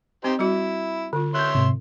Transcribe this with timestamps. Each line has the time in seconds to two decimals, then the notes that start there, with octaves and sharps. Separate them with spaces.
0.24 C4 D#4 G4 C5
0.39 G3 E4 F#4
1.13 D3 F4
1.35 C#5 E5 C6 F#6 G6
1.55 G#2 C3